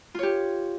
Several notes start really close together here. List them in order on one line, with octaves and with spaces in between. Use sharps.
F4 C#5 G4